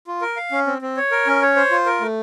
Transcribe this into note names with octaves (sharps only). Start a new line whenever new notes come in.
F4
A#4
F5
C#4
C4
C4
C#5
A#4
C#4
C#5
C5
F4
A#4
A3